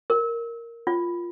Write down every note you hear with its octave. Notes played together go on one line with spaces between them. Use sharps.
A#4
F4